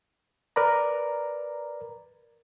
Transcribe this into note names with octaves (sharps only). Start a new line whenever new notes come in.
A#4 B4 D5 A#5